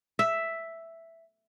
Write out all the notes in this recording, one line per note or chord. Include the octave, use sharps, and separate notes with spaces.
E5